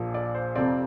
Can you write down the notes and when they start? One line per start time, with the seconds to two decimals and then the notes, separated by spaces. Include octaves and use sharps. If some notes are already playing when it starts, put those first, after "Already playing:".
Already playing: A#1 A#2 F3
0.14 D5
0.35 C5
0.55 F1 F2 C3 F3 C4 D5